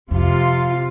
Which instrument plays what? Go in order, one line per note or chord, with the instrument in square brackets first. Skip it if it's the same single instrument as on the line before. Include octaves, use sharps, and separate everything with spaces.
[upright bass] F2 [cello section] C3 F4